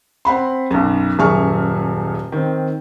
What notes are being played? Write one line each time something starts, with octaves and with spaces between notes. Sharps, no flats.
C4 F#5 B5 C6
B1 F#2
D#1 F#2 G#4 E5 C#6 F6
D#3 C4